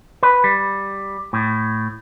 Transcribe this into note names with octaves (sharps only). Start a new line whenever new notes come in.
B4
G3
A2